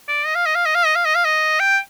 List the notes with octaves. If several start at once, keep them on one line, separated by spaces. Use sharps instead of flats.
D5
D#5
F5
D#5
F5
D#5
F5
D#5
F5
D#5
F5
D#5
G5